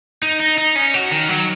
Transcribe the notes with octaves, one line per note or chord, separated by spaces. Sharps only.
D#4
D#4
D#4
C#4
F#4
D#3
F#3